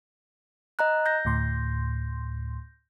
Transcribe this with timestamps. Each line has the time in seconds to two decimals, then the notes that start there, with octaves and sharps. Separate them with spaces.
0.79 D#5 A#5 F#6
1.06 G6 A#6
1.25 D2 A2 C6